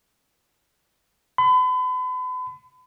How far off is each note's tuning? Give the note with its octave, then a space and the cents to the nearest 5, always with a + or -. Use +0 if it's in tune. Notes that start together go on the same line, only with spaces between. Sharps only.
B5 +40